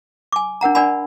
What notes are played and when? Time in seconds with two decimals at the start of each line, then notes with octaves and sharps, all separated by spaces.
0.32 G#5 D6
0.61 D4 A#4 F#5 A#5
0.75 D4 A#4 D5 F#5 G#5 B5